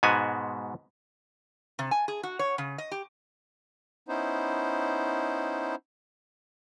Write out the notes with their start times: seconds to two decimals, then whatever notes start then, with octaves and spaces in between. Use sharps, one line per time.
0.03 G#2 B2 G#3 B3 F#4 G#5
1.79 C3
1.91 G#5
2.08 G#4
2.23 F#4
2.39 C#5
2.58 C#3
2.78 D#5
2.91 G4
4.08 B3 C#4 D#4 E4 C5